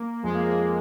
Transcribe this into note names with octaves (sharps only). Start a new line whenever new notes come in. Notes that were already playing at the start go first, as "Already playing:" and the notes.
Already playing: A#3
F2 F3 G#3
A#3
A#3